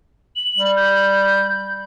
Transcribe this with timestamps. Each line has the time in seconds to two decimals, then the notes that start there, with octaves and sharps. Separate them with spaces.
0.36 F#7
0.57 G3
0.77 G6